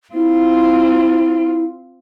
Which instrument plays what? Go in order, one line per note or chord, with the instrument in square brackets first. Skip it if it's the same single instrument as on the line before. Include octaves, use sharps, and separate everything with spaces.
[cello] C4 F4 [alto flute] E4